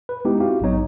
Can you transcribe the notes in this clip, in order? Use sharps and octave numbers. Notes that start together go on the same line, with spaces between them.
B4
G#3 B3 D#4 E4 G4
C4 E4 F#4 G4 F5
A#1 G#2 F#3 B3 D#4 C#5